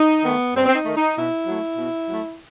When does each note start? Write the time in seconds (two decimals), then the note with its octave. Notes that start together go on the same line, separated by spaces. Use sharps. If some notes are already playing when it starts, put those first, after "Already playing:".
Already playing: D#4
0.24 D#3 A3 B3
0.55 G2 C4
0.66 C4
0.75 D#4
0.86 D#3 A3
0.96 D#4
1.16 B2 E4
1.47 F#3 A3
1.77 B2
2.08 F#3 A3